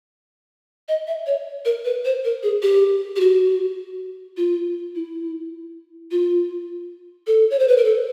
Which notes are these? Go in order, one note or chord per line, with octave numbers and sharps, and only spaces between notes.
D#5
E5
C#5
A#4
B4
C5
A#4
G#4
G4
G4
F#4
F4
E4
F4
A4
C#5
C5
B4
A#4
A4